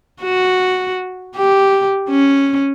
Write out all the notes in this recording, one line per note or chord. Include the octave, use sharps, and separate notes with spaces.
F#4
G4
C#4